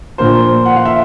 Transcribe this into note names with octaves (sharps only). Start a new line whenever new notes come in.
A#2 F3 A#3 D4 A#4 C5
F#5
F5
E5